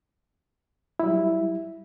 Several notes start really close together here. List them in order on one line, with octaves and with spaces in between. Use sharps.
E4 F#3 G3